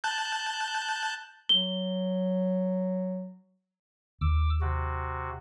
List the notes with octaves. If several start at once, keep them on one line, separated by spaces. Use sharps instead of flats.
A5 F#6 G6
F#3 G7
D#2 D6 E6
C3 F#4